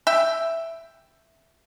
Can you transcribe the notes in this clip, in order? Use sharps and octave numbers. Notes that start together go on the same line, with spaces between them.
E5 G5